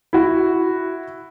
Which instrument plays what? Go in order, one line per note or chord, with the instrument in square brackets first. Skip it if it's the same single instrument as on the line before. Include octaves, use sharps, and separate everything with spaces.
[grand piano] E4 F#4